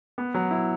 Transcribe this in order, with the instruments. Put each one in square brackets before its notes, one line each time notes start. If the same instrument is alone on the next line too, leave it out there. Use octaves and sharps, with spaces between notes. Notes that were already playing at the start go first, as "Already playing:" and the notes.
[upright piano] B3
F#3
E4